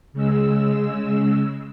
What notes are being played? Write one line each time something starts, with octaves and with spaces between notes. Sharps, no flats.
C#3 G#3 E6